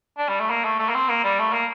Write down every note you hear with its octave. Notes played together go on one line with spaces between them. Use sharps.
D4
G3
A3
A#3
A3
A3
A#3
C4
A#3
G3
A3
A#3